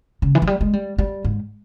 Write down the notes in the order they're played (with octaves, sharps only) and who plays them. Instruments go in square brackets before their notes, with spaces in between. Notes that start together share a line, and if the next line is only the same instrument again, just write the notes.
[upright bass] C#3
E3
F3
G3
G#3
G3
G3
G#2